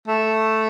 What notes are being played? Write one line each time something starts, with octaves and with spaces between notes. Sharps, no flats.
A3